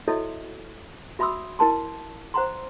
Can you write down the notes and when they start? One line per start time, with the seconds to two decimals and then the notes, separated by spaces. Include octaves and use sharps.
0.08 E4 F#4 A4 C#5 D#5 E5
1.19 F#4 E5 B5 C6 D#6 E6
1.59 E4 A#4 A5 C6
2.34 C5 F#5 A#5 C6